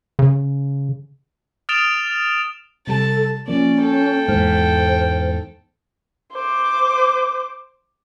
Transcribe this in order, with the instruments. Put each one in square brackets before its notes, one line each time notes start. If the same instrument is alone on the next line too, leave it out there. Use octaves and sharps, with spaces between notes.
[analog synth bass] C#3
[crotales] D#6 F6 A6 D7 E7 F7
[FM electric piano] C3 G3 [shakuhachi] A4 [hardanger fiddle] A5
[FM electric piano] F3 A#3 [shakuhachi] C#4 [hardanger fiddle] D5
[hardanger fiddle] A4 G5
[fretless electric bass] E2 G#2 [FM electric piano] G#3 F6 [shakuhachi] C5
[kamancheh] C5 D6